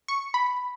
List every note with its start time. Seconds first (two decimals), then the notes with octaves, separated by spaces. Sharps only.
0.08 C#6
0.34 B5